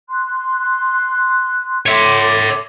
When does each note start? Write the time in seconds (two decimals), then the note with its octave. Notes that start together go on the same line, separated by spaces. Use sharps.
0.09 C6 F#6
1.86 A4 C#5 E5 C6 D6